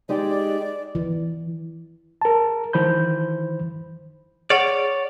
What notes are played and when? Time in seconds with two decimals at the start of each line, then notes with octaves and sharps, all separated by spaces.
0.09 G#3 D#4 G4 D5
0.95 E3
2.22 A#4 A5
2.73 D#3 E3 C5 B5 G6
4.50 G#4 C#5 D5 F#5